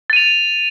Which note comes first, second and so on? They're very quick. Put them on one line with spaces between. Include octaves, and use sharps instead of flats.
A6 D#7 F7